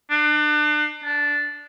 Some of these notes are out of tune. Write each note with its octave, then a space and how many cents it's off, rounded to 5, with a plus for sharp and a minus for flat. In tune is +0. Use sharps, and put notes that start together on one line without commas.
D4 +35
D4 -10